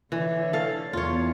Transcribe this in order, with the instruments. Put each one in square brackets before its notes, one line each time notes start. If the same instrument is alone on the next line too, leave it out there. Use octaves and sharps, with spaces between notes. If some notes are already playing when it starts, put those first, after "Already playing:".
[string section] D3 C#5 [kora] E3
[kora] A4 F5
[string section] E2 [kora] F4 C#5